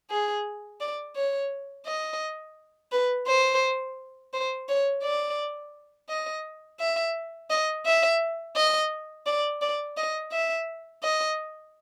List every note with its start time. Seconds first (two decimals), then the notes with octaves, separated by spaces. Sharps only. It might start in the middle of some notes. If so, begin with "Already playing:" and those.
0.11 G#4
0.81 D5
1.16 C#5
1.86 D#5
2.92 B4
3.28 C5
4.33 C5
4.69 C#5
5.04 D5
6.09 D#5
6.80 E5
7.50 D#5
7.86 E5
8.56 D#5
9.26 D5
9.62 D5
9.97 D#5
10.32 E5
11.03 D#5